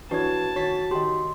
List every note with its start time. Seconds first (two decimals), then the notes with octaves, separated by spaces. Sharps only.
0.11 E3 D4 F#4 B4 C#5 A5 G#6
0.56 D#3 F#4 C#5 A6 B6
0.91 D#3 G4 D#5 C6